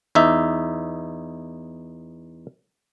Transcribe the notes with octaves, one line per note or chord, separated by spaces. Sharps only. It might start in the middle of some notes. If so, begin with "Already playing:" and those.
E2 D#4 E5